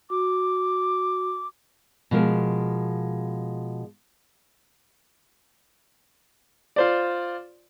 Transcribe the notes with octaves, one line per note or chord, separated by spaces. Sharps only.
F#4 D6
B2 F3 G#3 A#4
F4 C5 D5